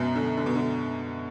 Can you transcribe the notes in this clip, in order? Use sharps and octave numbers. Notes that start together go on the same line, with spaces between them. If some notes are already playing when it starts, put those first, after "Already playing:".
Already playing: F#2 B2
D3
D3
B2
D3